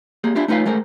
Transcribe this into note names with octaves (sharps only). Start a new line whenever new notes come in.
A#3 G4 G#4
D4 E4 F4 G4
A3 D#4 F4 B4 C#5 F5
G#3 A3 A#4 C5